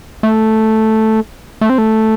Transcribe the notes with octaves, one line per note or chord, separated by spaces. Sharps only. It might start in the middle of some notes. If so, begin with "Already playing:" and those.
A3
A3
C4
A3